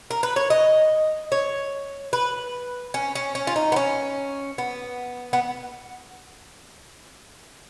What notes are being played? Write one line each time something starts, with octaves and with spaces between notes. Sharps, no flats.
A#4
B4
C#5
D#5
C#5
B4
C#4
C#4
C#4
F4
D#4
B3
C#4
B3
B3